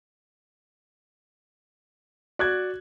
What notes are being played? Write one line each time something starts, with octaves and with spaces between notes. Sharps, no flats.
F#4 D5 F#6 G#6